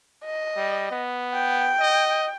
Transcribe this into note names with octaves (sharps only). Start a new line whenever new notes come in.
D#5
G3
B3
G5
D#5